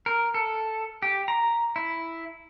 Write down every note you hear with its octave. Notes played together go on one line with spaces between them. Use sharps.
A#4
A4
G4
A#5
E4